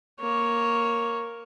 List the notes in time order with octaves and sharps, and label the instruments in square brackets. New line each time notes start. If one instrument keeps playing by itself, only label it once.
[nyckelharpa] A#3 C#5